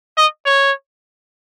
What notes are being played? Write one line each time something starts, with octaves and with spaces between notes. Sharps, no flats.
D#5
C#5